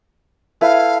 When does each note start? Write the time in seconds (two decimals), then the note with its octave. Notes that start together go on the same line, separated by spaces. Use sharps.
0.61 E4 A4 B4 F5